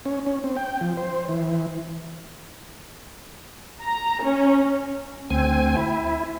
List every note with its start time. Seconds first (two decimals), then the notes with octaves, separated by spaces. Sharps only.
0.05 C#4
0.26 C#4
0.44 C4
0.56 G5
0.81 F3
0.97 C5
1.29 E3
3.83 A#5
4.24 C#4
5.30 D2 C4 G#5
5.77 E4